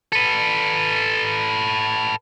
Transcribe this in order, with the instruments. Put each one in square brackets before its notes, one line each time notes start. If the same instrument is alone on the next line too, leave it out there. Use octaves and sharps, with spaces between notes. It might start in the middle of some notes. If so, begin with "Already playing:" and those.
[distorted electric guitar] A4 B4